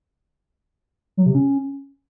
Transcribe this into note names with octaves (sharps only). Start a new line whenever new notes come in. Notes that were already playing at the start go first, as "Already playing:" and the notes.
F#3
C3
C#4